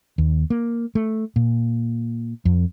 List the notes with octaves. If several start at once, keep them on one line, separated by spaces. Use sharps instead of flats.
D#2
A#3
A3
A#2
F2